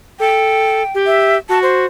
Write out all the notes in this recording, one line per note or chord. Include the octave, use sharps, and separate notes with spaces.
A4 G5
G4
E5
F#4 A5
C5